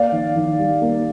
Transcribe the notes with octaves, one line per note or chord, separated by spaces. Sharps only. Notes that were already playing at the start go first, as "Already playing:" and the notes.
Already playing: A#3 D5 F5
D#3
D#3
G3
A#3